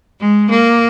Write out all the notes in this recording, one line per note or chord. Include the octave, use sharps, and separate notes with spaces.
G#3
A#3